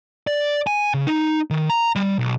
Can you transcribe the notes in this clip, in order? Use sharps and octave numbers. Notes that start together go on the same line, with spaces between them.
D5
G#5
C#3
D#4
D#3
A#5
G3
B1